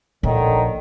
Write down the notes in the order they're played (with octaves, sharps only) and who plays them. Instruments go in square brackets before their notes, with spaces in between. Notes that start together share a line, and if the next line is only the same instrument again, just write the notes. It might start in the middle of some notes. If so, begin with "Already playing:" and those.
[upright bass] A#1 [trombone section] A2 D3 D#3